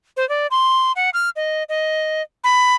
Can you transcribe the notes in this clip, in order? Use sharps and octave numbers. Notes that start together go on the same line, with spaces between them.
C5
D5
C6
F#5
F6
D#5
D#5
B5